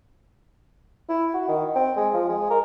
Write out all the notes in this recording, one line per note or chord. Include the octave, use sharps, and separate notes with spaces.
E4
F#4
D#3
C4
G#3
F3
G#3
A#4